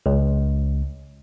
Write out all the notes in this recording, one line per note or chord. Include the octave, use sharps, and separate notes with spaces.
C#2